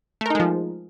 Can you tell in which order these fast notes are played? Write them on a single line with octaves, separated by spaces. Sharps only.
A3 A#4 D#4 G#3 F3